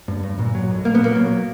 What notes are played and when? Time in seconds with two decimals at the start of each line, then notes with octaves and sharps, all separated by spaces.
0.08 G2
0.23 G2
0.39 A#2
0.55 F#3
0.70 B1
0.85 B1 A#3
0.95 B3
1.00 A#2 A#3
1.15 F#3